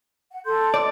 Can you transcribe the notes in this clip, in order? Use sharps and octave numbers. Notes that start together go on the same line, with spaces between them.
F#5
A4 C6 G6
D5